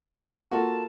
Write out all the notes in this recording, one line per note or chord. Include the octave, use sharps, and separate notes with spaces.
A#3 F4 F#4 A4 A5